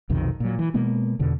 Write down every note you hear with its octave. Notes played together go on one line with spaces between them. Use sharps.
B1 F2 C3 D#3
A#2 F#3
E3
B2 G#3 A#3 B3
E2 B2 D3